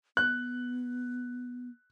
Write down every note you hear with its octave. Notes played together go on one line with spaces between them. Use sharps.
B3 F#6